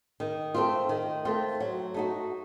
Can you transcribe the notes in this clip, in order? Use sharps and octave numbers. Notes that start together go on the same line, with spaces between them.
D#3
A3 C4 F4
D#3
A3 C4 F4
F#3
A3 D#4 F#4